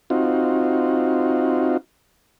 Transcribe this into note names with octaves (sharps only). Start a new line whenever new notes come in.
C4 D#4 F4 F#4